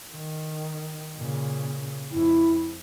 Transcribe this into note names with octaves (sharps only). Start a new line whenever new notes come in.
D#3
A#2 C#3
F2 E4